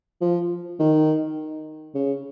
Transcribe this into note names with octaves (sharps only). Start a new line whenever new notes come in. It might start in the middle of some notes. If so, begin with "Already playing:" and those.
F3
D#3
C#3